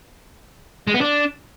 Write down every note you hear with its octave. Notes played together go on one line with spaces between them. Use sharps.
G#3
B3
D4